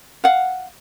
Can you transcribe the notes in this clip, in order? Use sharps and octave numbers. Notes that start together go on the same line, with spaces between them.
F5 F#5